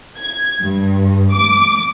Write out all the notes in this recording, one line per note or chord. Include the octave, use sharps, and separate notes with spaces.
G#6
G2
D6